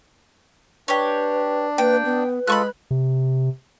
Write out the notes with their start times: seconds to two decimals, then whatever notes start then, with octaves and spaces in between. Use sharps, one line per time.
0.88 D4 G4 B4 C#5
1.78 A#3 B4 G5
2.05 B3 B4
2.47 G#3 F4 A4 B5 C#6 F#6
2.91 C3